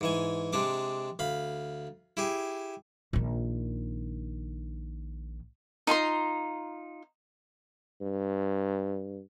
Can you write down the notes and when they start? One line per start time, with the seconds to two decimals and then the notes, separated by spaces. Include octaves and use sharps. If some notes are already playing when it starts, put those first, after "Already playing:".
0.01 G#2 E3 G#5
0.53 C3 G#3 D4 D6
1.19 D2 F5 B5
2.17 E4 G4 G#4
3.13 A#1 D#3
5.87 D#4 F4 A#5 C6
8.01 G2